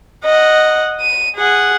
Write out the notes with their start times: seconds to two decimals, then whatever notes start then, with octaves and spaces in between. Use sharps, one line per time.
0.25 D#5 F#5
1.01 D#7
1.36 G#4 F#5